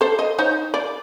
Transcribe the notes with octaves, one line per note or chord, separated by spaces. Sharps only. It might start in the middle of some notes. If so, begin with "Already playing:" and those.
A4 C5
D#5
D#4 C5 C#5
D5